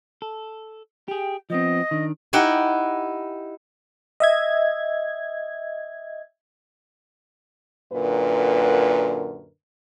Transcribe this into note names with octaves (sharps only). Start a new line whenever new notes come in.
A4
G4 G#4 G5
F3 B3 C4 D#5
D#3 D4
D#4 E4 G4 F#5 G5
D#5 E5 G#6
F#2 A#2 D3 A#4 B4